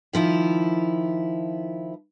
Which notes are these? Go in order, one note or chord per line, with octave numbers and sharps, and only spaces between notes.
D#3 F3 E4 F4